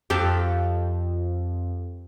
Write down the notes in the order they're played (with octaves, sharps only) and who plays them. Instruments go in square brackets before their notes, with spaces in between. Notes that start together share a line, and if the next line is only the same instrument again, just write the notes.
[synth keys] F2 [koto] G4 A4 F5